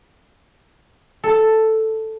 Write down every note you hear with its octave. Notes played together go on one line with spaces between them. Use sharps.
A4